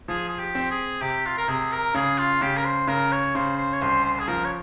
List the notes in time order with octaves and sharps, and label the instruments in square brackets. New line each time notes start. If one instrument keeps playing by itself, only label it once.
[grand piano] F3 [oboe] G#4
[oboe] G#4
G4
[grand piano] C4
[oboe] G#4
[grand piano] C3 [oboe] G4
[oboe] F4
A#4
[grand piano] C3 [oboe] G#4
[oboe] A#4
[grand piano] C#3 [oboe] G#4
[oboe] F4
[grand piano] C#3 [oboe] G4
[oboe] A#4
C5
[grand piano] C#3 [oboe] A#4
[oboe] C#5
[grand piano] C#3 [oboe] C5
[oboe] C5
C#5
[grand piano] C2 [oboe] C5
[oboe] C5
G#4
[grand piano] F3 [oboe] A#4
[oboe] C#5